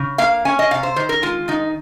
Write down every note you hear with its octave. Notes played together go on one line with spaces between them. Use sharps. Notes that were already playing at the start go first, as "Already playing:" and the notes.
Already playing: C#3
A#3 F5
C#4 G#5
D#5
C3 F5
C5
D#3 C5
A#4
G#3 F4
D#3 D#4